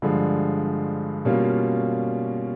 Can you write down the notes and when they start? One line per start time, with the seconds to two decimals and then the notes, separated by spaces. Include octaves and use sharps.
0.02 G2 D3 F3 G#3
1.25 B2 G3 A#3 C#4 F4